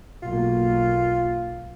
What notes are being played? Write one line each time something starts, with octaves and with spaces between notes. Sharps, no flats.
B1 A#3 F4